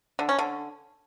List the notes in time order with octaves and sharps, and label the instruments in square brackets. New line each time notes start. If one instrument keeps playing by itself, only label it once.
[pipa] D3
C#4
D3